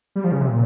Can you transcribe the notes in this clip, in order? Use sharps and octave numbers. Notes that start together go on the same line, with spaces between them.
G3
F3
C#3
C3
A#2